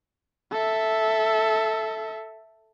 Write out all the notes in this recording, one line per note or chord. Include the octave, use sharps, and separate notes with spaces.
A4 E5